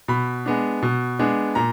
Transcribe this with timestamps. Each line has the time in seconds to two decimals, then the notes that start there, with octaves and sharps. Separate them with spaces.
0.08 B2 B5
0.46 G#3 B3 D4
0.82 B2
1.19 G#3 B3 D4
1.55 A#2 A#5